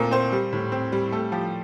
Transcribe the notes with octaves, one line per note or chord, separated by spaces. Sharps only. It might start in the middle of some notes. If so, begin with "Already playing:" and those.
Already playing: A#2 A3 C4 A#4
C4 C5
G3
A2
C4
G3
A3 A4
F3 G4